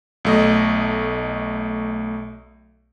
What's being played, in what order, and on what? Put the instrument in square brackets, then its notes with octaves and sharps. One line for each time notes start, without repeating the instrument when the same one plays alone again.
[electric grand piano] B1 A3 D#5